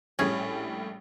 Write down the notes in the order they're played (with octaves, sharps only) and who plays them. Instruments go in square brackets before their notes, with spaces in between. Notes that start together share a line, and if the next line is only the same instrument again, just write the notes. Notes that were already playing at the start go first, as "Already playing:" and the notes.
[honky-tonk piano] A#1 A2 G3 [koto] C#4 G#4